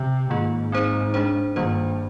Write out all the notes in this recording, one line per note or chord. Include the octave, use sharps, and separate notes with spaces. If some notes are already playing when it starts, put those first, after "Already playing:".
Already playing: C3
G#2 D#3 A#3 F4 G#4
C4 D#4 G#4 C5
G#3 D4 G#4 C5
G2 D#3 G3 A#3 F4 C5